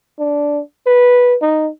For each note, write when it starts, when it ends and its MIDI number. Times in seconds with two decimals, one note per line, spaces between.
0.19 0.60 62
0.87 1.36 71
1.42 1.70 63